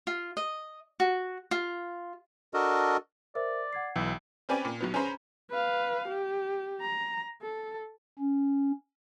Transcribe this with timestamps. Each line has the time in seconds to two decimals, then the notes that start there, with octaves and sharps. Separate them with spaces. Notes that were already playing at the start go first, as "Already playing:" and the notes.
0.07 F4
0.37 D#5
1.00 F#4
1.51 F4
2.54 D4 F#4 A4 A#4 D#5
3.35 A#4 C5 D5 E5
3.73 F#5 G#6 C7
3.95 B1 E3 G5 E6
4.49 C4 C#4 B4 D5 G5 G#5
4.65 A#2
4.80 B1 F#3 B3
4.94 C#4 G#4 B4 C5 A#5 B5
5.51 B4 F5
6.08 G4
6.81 A#5
7.42 A4
8.19 C#4